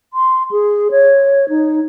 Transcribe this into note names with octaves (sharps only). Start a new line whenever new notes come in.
C6
G#4
C#5
D#4